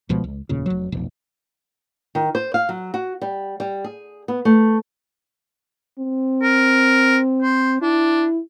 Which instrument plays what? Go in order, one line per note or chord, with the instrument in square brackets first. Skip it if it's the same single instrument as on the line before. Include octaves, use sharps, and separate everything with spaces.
[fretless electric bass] C#2 B2 F3 G#3
C#2
F1 D#2 A#2 C#3
F1 F#3
F1 B1 F2
[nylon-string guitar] D#3
C5
F5
F#3
F#4
G3
G3
G#4
B3
A3
[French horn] C4
[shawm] A#4
C5
[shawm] D4 [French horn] E4